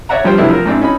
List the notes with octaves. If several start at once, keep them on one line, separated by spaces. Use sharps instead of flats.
C#5 D5 E5 F#5 A#5
G2 F3 G3 C5 G5
C3 F#3 A3 B3 D4 E4
F3 A#4
G#2 C4 D4 E4
C#4 D#4 A4 B5